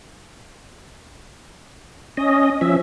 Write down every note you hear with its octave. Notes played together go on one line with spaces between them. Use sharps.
C#4 D#5
F3 C#4 E5